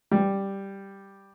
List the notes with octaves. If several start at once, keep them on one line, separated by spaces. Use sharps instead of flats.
G3